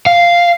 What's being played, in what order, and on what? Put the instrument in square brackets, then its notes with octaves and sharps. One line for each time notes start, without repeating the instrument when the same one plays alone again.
[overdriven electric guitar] F5